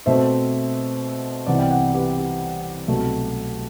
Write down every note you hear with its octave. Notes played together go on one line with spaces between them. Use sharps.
B2 A3 C4 C5 E5
C2 C3 E3 B3 D5 F#5
G5
D5 F#5
G4 B4
G4
C2 B2 F#3 A3